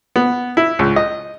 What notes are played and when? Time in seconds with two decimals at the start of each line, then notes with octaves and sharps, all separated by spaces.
0.16 B3
0.57 E4
0.79 C#2
0.96 D#5